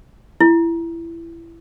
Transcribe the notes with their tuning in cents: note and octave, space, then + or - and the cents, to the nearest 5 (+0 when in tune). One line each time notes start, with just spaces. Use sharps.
E4 +20